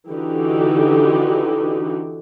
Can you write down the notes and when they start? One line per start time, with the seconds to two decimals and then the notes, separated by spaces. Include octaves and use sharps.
0.11 D3 E3 D#4 F#4 G4